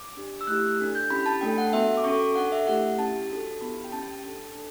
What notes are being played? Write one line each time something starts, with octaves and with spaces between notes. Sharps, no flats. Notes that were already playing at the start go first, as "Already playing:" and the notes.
Already playing: D6
D4 G4
E6
A3 E4 G4 F#6
D4 A4
G6
C#4 E4 G4 B5
A5
A3 D4 A4 G5
F#5
B3 F#4 A4 E5
D6
C#4 F#4 A4 C#6
D6
D4 A4 F#5
E5
A3 E4 G4 F#5
C#4 E4 G4 A5
D4 F#4 A4
B3 E4 G4 B5
G5
C#4 G4 A5
D4 A4
D4 A4